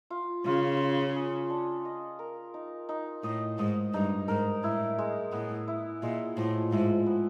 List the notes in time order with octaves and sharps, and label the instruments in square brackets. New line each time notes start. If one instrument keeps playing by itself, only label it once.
[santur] F4
[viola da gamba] C#3 [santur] F4
[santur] F4
G#4
D4
D#5
A#4
D#4
D#4
[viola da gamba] A2 [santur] D#5
[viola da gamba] G#2 [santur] D#5
[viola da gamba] G2 [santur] D#4
[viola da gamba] G#2 [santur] A#4
[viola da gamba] A2 [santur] E4
[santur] G#3
[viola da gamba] A2 [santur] B3
[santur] E4
[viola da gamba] A#2 [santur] G#3
[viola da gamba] A2 [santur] F3
[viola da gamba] G#2 [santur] E4
[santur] B3